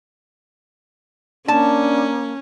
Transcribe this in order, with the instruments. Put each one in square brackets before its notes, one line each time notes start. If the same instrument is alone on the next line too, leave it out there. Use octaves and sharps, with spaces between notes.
[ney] A#3 [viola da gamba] C#4 [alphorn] D4 [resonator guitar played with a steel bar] A5